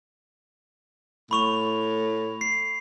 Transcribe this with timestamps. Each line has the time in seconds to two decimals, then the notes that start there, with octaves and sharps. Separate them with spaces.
1.31 A2 B5 C#6 F7
2.41 C7